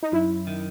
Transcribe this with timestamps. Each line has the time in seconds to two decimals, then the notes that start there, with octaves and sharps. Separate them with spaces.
0.03 D#4
0.12 F#2 E4
0.47 D#3